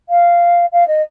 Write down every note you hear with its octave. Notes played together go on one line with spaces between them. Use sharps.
F5
F5
D#5